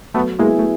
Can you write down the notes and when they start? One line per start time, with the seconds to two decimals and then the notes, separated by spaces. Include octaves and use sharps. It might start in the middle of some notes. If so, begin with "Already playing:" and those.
0.14 F#3 A3 B3
0.39 G#3 A#3 B3 E4 G#4
0.59 A3